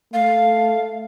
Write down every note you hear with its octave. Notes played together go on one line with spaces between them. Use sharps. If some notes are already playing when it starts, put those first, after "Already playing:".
A3 F5